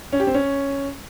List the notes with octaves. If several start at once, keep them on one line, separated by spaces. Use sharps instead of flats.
C#4
G4
C4
C#4